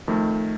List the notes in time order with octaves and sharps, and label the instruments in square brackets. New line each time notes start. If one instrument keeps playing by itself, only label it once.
[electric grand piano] F2 D#3 A3